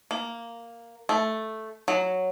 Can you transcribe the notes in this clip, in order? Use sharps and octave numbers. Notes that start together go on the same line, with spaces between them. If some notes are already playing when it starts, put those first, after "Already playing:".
A#3
A3
F#3